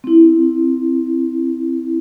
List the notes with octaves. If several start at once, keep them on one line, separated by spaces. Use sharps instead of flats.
C4 E4